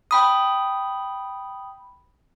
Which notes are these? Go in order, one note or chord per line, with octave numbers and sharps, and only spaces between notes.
G5 B5 D#6